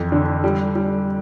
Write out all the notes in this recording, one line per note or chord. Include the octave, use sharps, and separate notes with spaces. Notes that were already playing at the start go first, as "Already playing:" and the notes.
Already playing: F2 E3
D3
G3
G3